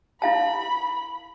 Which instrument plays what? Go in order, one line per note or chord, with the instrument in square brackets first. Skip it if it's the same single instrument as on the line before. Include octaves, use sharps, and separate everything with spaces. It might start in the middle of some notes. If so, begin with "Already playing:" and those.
[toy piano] E4 F5 A5 [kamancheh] B5